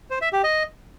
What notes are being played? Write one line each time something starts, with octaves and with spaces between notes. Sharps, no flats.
C5
E5
G4
D#5